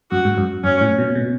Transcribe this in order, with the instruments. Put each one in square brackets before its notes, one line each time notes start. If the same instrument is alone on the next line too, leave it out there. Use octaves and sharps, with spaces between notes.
[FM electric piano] F#2 [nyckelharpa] F#4
[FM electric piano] G#2
F#2
[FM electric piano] F#2 [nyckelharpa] C#4
[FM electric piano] A2
B2
B2